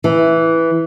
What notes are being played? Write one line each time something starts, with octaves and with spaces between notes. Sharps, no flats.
E3